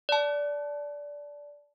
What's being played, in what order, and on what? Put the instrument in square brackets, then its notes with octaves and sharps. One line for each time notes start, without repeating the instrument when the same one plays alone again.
[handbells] D5 A5